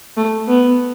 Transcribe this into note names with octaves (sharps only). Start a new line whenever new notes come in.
A3
B3